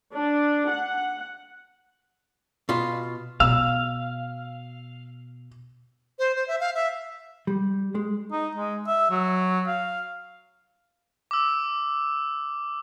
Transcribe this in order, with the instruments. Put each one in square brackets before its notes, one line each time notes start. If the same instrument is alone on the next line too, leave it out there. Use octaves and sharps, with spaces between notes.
[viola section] D4
F#5
[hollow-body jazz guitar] B2 F4
[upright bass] B2 [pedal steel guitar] F5 [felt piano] E6
[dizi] C5
C5
E5
F5
E5
[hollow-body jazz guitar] G3
G#3
[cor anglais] D#4
G#3
E5
F#3
F5
[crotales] D6 E6